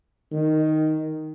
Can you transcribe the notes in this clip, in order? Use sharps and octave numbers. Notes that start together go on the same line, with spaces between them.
D#3